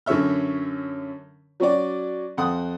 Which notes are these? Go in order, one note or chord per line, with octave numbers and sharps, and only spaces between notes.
F#2 D3 C#4 C#5 E5 F6
F#3 C#4 F#4 D5
F2 F#5 C6 D#6